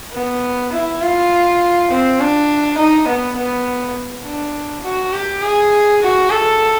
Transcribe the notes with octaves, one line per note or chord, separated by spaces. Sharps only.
B3
E4
F4
C4
D4
D#4
B3
B3
D4
F#4
G4
G#4
F#4
A4